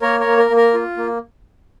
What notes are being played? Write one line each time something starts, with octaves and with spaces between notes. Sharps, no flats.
A#3 A#4 C#5
A#4 C#5
A#3
A#4
A#3
A#4
F4
A#3